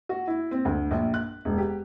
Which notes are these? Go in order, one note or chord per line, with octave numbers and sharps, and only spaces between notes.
F#4
E4
C4
D2
A#1
F#6
E1
G4